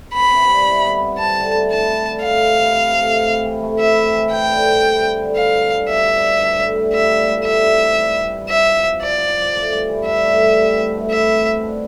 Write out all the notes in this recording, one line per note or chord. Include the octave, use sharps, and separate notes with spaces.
B3 B5
C3
G3
E4
B3
C3
C4 A5
D3
A3
E4 A5
C4
D3
A3 F5
C3
E3
C3
A3
C3
C4
E3
A3
E4 E5
C4
E3
C4 G5
D3
G3
E4
C4
D3
D4 F5
B2
G3
B2 E5
D4
B2
D4
A2
G3
F4 E5
D4
A2
G3 E5
C3
E3
D4
G3
C3
F4 E5
F3
C4
F3 D5
F4
F3
A3
G2
E3
D4 E5
A3
G2
C4
B2
A3
E4 E5
C4
B2
D4